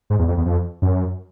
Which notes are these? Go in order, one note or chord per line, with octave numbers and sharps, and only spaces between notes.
G#2
E2
F2
E2
F2
F#2